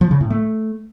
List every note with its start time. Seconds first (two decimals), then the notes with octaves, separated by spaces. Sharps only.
0.01 F3
0.11 C#3
0.21 A2
0.30 A3